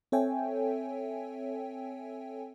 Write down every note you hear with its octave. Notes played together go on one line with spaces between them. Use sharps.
C4 A4 C#5 E5 G5 G#5